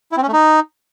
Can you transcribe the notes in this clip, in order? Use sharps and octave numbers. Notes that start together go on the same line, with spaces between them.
E4
C4
C#4
A3
D#4